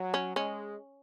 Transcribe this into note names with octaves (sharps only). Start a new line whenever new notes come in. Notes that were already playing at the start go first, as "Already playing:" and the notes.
Already playing: F#3
C#4
G#3 C#4